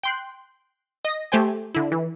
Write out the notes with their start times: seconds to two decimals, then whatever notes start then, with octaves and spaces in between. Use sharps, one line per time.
0.03 G5 C6 F#6
1.05 D#5 A#6
1.32 A3 G4 C5 G5 G#5
1.75 D3 E4
1.92 E3